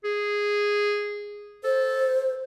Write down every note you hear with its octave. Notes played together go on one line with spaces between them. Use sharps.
G#4
A4 C5